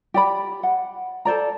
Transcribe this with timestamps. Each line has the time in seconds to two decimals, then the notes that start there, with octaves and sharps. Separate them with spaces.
0.14 G4 D5 B5
0.63 F#5
1.25 A4 C5 D5 A#5